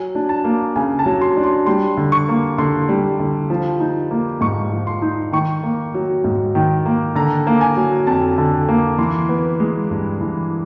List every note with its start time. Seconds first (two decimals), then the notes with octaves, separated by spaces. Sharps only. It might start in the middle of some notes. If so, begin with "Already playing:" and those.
Already playing: F#3 G#5
0.15 D4
0.29 A5
0.44 A#3
0.76 C#3 G#5
0.99 A5
1.06 F#3
1.21 C6
1.37 D4
1.44 C6
1.66 G3 C6
1.97 D3
2.12 C#6
2.29 A#3
2.58 D3 C6
2.89 G3
3.20 D3
3.50 F3
3.80 D#4
4.11 A#3
4.41 G#2 C#6
4.72 F3
4.87 C6
5.02 D#4
5.32 D#3 C#6
5.63 A#3
5.94 F#3
6.24 G#2
6.55 D#3
6.86 A#3
7.15 D3 A#5
7.47 A#3
7.61 G#5
7.77 F#3
8.07 F2 A5
8.38 D3
8.69 A#3
8.99 E3 C6
9.29 B3
9.60 G#3
9.90 G2
10.21 E3